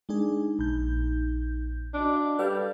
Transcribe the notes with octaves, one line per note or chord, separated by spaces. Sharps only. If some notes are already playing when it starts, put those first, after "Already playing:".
G#3 D4 D#4 G#4
A#1 G6
D4 F#4 D5 D#5
F5
G3 A4 B4 F5